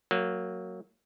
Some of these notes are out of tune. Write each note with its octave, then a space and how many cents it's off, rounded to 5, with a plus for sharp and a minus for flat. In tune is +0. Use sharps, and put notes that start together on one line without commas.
F#3 +0 A#3 -15